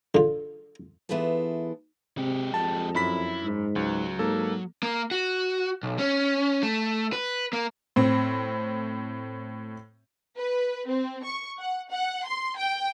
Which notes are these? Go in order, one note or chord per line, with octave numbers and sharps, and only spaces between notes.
D3 F4
E3 B3 E4 F4 G#4 A4
C3 G#3 G4
F2 A5
F#2 E4 B5 B6
G#2
C#2 F#3
G#2 A#3 A4
A#3
F#4
B1
C#4
A3
B4
A#3
A2 C4
B4
C4
C#6
F#5
F#5
C6
G5